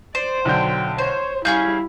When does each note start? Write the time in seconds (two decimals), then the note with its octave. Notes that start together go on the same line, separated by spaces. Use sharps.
0.15 C5 D5
0.45 B1 D3 F#3 G5 G6
0.98 C5 C#5
1.45 G3 C#4 E4 G#4 F5 G6